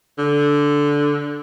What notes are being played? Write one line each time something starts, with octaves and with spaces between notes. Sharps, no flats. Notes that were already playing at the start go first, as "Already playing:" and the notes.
D3